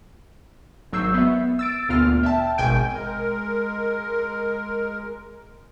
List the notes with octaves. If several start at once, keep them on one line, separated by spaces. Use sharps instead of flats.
G#1 F#3 C#6 E6 G6 C7
B3 E5
E6 A6 D7
D2 A#2 B3 F4 F6
E5 G5 A5
G#1 B2 G5 G#5 G6 D7
G#3 A#4